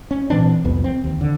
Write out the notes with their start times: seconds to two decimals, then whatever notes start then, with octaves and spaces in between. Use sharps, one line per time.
0.11 C#4
0.30 A#2 E3 C4 D4
0.64 C2 F2 B3
0.84 C4
1.04 D#2
1.21 D3